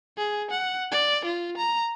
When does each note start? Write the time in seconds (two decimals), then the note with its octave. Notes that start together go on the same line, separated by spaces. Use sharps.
0.17 G#4
0.51 F#5
0.92 D5
1.25 F4
1.58 A#5